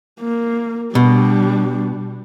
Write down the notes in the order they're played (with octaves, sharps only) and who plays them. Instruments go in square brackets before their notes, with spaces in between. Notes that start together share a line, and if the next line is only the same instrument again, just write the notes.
[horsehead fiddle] A#3
[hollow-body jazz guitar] B2 [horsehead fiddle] G3 D4